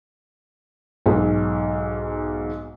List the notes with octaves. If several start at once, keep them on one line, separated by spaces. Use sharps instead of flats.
B1 G#2